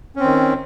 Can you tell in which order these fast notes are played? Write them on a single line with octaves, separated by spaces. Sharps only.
C#4 C4 D#3